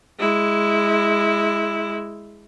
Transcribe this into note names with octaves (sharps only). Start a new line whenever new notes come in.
G#3 E4